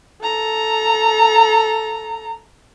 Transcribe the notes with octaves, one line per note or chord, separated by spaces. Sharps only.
A4 A#5